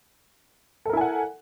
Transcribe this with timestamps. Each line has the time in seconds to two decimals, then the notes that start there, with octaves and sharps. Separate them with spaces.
0.85 A4
0.89 A#4
0.93 E4
0.97 G#5
1.01 F#5